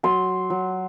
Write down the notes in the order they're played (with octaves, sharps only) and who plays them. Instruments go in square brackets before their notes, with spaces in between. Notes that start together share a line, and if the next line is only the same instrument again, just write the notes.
[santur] F#3 C6
F#3